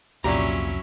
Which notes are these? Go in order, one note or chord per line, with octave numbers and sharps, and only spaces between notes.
C2 F2 A#2 F#3 C#4 E4 G4 A#5